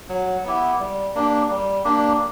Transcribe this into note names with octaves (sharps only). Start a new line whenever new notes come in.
F#3
B3 E4 G4
G3
A#3 D4 G4
G3
A#3 D4 G4